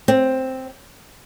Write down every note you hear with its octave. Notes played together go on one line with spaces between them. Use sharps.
C4